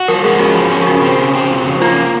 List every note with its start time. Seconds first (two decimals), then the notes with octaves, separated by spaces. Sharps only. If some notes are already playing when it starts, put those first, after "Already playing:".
Already playing: F#4
0.08 F3 A#4
0.24 G#3 G#4
0.39 C#4 F#4
0.55 F3
0.71 C#4
0.82 G#4
0.87 C#3 F#4
1.03 C4
1.18 C#3
1.33 C4
1.50 F3
1.65 C#3
1.81 A#3 F4